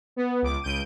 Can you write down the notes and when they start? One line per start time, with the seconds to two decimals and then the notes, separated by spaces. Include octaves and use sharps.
0.16 B3
0.42 C#2 D6
0.61 C#2 G6 D7 D#7